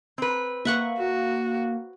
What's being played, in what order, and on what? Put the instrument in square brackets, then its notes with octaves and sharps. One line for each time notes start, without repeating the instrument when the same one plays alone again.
[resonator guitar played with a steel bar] C4 B4
[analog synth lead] A#3 [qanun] E5 F#5 C#6
[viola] F#4